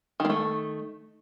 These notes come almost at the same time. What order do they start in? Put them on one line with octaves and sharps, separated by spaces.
D#3 A#3 A3